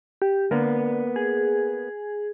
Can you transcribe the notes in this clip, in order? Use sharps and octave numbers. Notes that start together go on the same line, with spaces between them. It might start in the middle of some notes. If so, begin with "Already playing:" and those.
G4
D3 A#3 B3
G#4